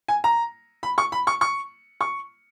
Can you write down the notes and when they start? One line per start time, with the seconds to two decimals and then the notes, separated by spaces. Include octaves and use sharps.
0.08 G#5
0.24 A#5
0.83 B5
0.98 C#6
1.12 B5
1.27 C#6
1.41 C#6
2.01 C#6